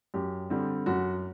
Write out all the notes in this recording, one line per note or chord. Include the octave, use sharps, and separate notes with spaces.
F#2 G4
D3 G3 C4
F#2 F#4